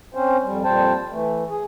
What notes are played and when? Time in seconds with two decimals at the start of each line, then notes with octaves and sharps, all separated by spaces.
0.14 C4 C#4 C5
0.44 F2 G3
0.64 F2 A#2 G3 C5 G5 A5
1.11 E3 A3
1.49 G#4